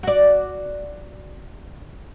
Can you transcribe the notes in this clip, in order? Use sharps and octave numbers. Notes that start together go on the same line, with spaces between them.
F#4 D5